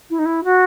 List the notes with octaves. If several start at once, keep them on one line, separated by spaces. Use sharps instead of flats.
E4
D#4
E4
F#4